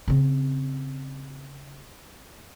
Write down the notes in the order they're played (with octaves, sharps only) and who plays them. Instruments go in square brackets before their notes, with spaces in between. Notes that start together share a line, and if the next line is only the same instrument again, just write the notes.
[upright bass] C#3 C4